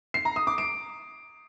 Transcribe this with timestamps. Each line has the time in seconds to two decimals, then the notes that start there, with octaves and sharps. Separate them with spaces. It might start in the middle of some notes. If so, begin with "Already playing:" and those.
0.14 C7
0.25 A#5
0.36 D#6
0.47 D6
0.58 D7